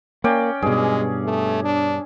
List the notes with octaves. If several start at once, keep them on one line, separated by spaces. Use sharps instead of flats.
A#3 C#4 D5 G5
G2 B2 G#3 G#4
A3
D4